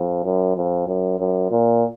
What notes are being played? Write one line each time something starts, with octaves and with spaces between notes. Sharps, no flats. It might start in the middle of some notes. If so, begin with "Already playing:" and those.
Already playing: F2
F#2
F2
F#2
F#2
A#2